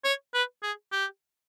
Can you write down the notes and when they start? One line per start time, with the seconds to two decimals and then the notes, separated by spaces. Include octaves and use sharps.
0.05 C#5
0.34 B4
0.63 G#4
0.92 G4